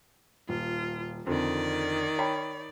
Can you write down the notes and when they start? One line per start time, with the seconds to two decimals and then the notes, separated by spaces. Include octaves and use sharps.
0.49 D#1 F4
1.27 F2 D3 D#3 D5
2.18 C#5 G5 B5